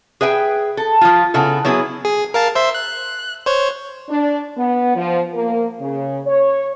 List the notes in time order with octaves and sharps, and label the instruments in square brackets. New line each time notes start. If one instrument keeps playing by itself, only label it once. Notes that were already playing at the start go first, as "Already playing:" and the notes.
[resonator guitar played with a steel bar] G#4 B4 E5 G5
A4
F3 F4
C#3 B3 E4 A4
F#3 B3 E4 G#4
[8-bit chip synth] G#4
A#4 F5 A5
C5 E5 C6
F#6
C5 C#5
[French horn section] D4
B3
F3
A#3
C#3
C#5